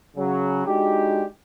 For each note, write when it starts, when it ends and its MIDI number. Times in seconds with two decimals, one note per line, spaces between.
0.17 0.63 49
0.17 0.63 54
0.66 1.25 56
0.66 1.25 62
0.66 1.25 63
0.66 1.25 66
0.66 1.25 67